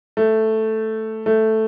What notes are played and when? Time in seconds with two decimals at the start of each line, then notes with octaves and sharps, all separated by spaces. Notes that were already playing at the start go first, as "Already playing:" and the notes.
0.17 A3
1.26 A3